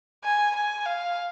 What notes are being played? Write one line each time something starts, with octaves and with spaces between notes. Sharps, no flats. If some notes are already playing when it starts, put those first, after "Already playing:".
G#5
G#5
F5